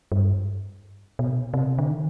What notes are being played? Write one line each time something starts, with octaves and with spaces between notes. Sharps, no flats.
G2
B2
C3
D3
D#3